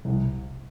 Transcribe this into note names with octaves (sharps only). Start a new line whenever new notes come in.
C2